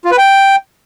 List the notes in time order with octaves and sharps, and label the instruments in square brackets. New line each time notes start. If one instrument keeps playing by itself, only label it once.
[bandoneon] F4
B4
G5